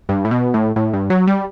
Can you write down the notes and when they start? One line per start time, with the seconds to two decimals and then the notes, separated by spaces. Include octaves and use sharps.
0.09 G2
0.25 A2
0.31 B2
0.54 A2
0.76 A2
0.93 G2
1.10 F#3
1.27 G3